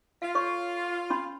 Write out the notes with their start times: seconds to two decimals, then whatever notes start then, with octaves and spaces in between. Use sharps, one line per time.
0.22 F4 F5
0.35 A4 C#5 C#6
1.10 C#4 B5 C6